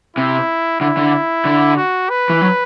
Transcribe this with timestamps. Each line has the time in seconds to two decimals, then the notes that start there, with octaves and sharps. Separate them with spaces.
0.17 C3 E4
0.81 D3 E4
0.97 D3
1.45 D3
1.77 F#4
2.10 B4
2.30 E3
2.41 F#3